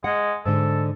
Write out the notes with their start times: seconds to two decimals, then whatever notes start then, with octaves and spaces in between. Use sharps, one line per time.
0.04 G#3 F#5
0.45 G#2 D3 A4